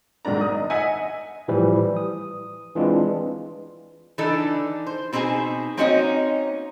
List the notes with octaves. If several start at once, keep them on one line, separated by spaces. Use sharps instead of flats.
B1 G#2 D#3 D4 A#5
D#6
D#5
D#5 E5 F#5 G#5
A2 E3 F3 G3
D#6
E3 G#3 C4 D4 F4
E3 D4 D#4 A4
C5
B2 C4 D#4 G#4 G#5
A#3 C4 C#4 D#4 F#4 D#5